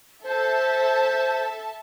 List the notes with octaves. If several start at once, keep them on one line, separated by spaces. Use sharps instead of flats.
A4 C5 E5 A5